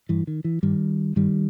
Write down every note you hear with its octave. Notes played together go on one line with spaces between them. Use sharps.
G2 E3
D#3
E3
G2 D#3 G3
G2 D#3 G3